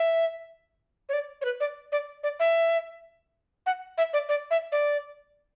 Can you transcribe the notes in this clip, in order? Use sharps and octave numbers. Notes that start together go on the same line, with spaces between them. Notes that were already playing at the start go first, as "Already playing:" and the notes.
Already playing: E5
C#5
D5
C#5
B4
D5
D5
D5
E5
F#5
E5
D5
D5
E5
D5